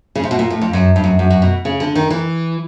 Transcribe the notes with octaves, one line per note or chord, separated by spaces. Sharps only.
C#3
C3
B2
A#2
A2
F2
F#2
G2
F#2
F#2
F#2
B2
C#3
D3
D#3
E3